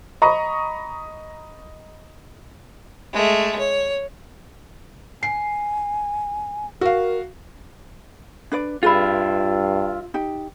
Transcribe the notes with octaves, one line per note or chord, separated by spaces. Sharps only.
D#5 A#5 B5 C#6 D#6
G#3 A3
C#5
G#5 C7
F#4 A#4 F5
D4 B4 D5
G2 F4 G#4 B4 E5 B5
D#4 G4